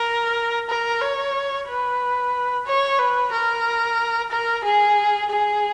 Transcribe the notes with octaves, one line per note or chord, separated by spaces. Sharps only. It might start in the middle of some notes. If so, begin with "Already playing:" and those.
Already playing: A#4
A#4
C#5
B4
C#5
B4
A#4
A#4
G#4
G#4